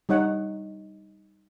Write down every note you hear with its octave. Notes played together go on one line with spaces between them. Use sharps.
G3 D#4 C#5 F#5